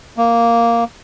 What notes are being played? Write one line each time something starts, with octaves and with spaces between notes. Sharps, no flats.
A#3